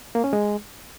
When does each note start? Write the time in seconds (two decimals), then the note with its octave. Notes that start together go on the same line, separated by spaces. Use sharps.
0.15 A#3
0.24 C#4
0.33 G#3